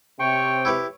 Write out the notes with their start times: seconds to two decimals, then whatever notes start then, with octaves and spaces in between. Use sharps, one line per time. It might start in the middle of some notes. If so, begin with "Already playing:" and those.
0.20 C3 C#5 G5 C#6
0.65 E4 G4 B4